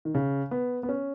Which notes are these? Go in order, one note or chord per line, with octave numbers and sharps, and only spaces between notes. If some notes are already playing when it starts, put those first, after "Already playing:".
D#3
C#3
B3
B3
C#4